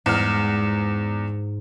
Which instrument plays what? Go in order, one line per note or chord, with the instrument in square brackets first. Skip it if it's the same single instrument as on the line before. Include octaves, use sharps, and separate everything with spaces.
[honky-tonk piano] E2 F6 [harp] G#2